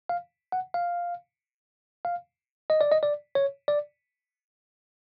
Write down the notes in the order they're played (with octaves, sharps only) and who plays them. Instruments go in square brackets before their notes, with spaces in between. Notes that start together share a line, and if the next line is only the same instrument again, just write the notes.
[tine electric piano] F5
F#5
F5
F5
D#5
D5
D#5
D5
C#5
D5